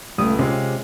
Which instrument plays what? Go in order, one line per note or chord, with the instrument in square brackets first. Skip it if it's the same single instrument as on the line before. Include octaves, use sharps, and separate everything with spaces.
[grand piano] C#2 [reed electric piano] G3 D#6 [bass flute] A3
[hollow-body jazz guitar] C3 [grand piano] G#3 C#4 F4 [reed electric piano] C4 [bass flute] G4